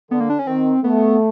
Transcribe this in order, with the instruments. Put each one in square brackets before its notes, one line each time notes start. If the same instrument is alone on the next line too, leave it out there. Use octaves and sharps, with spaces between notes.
[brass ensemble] D3 [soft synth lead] B3
[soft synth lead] A#3
D4
C#4
[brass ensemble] D#3 [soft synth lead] C4
[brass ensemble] A3 [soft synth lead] B3